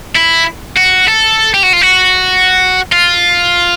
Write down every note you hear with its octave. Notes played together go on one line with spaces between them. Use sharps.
E4
F#4
A4
G4
F#4
F4
F#4
F4